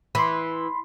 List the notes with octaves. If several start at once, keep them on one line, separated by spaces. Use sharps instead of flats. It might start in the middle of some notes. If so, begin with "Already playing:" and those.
E3 B5 C6